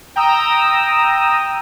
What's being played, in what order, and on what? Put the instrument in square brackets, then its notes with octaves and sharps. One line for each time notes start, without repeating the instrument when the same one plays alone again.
[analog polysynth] G5 A#5 D#6 E6